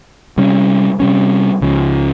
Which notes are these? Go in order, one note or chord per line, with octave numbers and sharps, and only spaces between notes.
C3 G3 C#4
C3 G3 C#4
C#2 C#3 F3